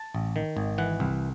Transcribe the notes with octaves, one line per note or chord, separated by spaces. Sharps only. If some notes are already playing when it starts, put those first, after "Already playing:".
Already playing: A5
A1
D#3
G#1
E3 F#5
C2